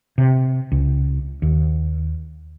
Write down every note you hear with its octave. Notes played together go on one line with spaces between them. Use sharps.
C3
C#2
D#2